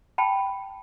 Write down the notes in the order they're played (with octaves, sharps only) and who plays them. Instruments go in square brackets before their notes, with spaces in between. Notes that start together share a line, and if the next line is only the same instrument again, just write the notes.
[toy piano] G5 A5 B5